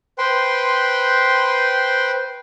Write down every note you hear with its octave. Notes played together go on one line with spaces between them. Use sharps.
B4 C5 G5 C6